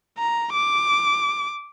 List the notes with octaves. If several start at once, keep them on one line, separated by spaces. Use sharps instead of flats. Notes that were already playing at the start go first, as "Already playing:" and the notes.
A#5
D6